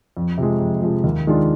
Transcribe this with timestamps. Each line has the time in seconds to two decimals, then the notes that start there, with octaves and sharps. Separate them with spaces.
0.17 F2
0.38 C3 F3 G#3
0.61 F2
0.82 C3 F3 G#3
1.04 D#2
1.27 D#3 G#3 D4 F4